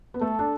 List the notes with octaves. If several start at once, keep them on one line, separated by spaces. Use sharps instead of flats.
B3
A3 A4
D4